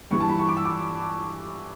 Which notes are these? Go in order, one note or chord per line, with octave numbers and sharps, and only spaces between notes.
G2 E3 G3 C#6
A5
B5
C#6
D6
E6
D6